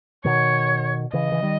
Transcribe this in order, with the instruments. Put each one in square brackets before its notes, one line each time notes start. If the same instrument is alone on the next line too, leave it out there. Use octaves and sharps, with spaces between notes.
[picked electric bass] B2 D#3 [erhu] C#5
[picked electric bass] C#3 E3 [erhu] D#5
[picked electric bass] E3
D#3 G3